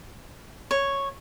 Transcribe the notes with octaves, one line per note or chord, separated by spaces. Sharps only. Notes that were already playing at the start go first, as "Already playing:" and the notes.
C#5